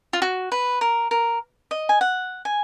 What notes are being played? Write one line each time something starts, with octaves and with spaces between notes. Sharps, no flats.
F4
F#4
B4
A#4
A#4
D#5
G#5
F#5
G#5